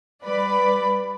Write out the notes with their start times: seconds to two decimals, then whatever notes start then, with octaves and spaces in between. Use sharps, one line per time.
0.23 G3 B4 D5 B5